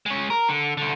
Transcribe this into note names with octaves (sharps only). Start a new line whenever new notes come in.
G#3 C#4
A#4
D3
C2 D3